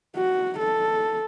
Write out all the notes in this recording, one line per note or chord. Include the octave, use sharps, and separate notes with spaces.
F#4
A4